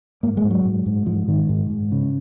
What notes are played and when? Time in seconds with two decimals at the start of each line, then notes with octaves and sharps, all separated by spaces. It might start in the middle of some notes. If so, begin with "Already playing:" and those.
0.23 G#2 A#3
0.37 G#3
0.44 G#2
0.51 F#3
0.65 G#2
0.86 G#2
1.06 G#2 F3
1.27 G#2 D#3
1.49 G#2
1.70 G#2
1.92 C#3